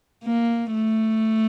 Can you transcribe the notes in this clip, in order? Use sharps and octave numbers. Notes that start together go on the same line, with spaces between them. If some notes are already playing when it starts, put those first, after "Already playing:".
A#3
A3